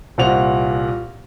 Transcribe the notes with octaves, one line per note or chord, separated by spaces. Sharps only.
C2 A#2 C5 F#5 F7